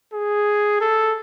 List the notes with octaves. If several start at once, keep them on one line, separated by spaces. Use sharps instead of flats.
G#4
A4